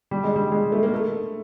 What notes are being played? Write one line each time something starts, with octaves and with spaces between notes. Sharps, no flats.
G3
G#3
G3
G#3
A3
A#3
A3